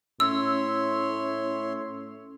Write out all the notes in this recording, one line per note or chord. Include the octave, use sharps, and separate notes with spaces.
A2 C#4 C#5 E5 C6 E6